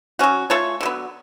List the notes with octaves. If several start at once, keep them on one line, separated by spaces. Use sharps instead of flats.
F#3 C#4 F#4
A3 F4 A4 C#5
D3 F#3 B3